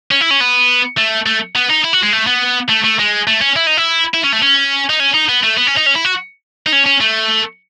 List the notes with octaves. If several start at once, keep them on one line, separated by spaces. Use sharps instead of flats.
C#4
E4
C#4
B3
A3
A3
B3
D#4
E4
F#4
G#3
A3
B3
A3
A3
G#3
A3
C#4
E4
D#4
E4
E4
C#4
A3
C#4
D#4
C#4
D#4
B3
A3
B3
C#4
D#4
C#4
E4
F#4
D#4
C#4
C#4
A3